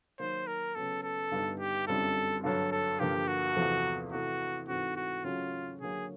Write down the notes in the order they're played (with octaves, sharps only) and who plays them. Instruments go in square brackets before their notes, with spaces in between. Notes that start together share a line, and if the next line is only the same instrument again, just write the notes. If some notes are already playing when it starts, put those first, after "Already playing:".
[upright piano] D#3 F#3 A#3 [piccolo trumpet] C5
[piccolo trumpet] A#4
[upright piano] C#3 F#3 B3 [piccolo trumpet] A4
[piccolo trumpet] A4
[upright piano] G2 D3 G3 B3 D#4
[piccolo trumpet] G4
[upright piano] F#2 D3 G3 C4 F4 [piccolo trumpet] A4
[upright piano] G2 D3 F#3 [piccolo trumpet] A4
[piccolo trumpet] A4
[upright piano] G2 D3 F3 A#3 [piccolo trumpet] G4
[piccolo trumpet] F#4
[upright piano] E2 C3 F3 A3
[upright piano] C3 E3 A3 [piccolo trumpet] F#4
[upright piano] G#2 E3 A3 C4 [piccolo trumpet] F#4
[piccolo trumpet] F#4
[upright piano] C#3 F#3 A3 C#4 F#4 [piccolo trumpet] F4
[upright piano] D3 F#3 A#3 [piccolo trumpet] G#4